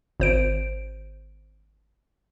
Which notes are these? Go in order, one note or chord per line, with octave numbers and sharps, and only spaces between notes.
G#1 C5 D7